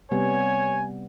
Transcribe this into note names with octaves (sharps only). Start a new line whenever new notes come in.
C3 G3 B3 C#5 G#5